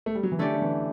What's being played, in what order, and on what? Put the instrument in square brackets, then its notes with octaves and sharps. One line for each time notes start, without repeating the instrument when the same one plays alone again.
[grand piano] A3
G3
F#3
E3
[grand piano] D3 [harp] A3 C#4 G4 D5
[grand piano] D3
E3